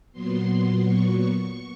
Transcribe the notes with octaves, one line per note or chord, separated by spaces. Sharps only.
A#2 F#3 B3 C6
C#6